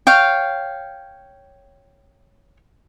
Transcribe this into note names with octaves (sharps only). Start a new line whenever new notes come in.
C#5 F5 G5